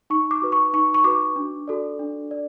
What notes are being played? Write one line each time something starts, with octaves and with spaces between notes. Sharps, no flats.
D#4 C#6
D6
F#4 B4
C#6
D#4 C#6
C#6
F#4 B4 D6
D4
F#4 A4 D5
D4
D5